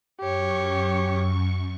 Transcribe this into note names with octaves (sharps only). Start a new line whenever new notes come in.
F#2 G4 C#5 C#6